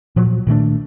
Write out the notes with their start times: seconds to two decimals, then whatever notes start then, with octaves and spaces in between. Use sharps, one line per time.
0.16 A#2 F3 F#3
0.47 A#2 D#3 A3 D4